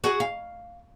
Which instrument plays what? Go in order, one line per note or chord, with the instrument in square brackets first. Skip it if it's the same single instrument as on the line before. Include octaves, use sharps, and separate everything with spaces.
[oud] F#4 G#4
F5